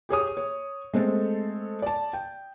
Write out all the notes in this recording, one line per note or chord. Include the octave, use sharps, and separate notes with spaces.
G4 G#4 C#5 D#6
C#5
G#3 A3 C4 A4
D5 A5
G5